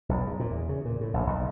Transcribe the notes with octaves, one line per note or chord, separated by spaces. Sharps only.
B1
G#2
A#2
E2
C#3
A#2
A2
A#1
B1